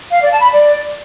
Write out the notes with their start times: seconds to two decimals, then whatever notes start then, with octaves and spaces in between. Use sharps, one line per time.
0.11 F5
0.21 D5
0.31 A5
0.41 B5
0.51 D5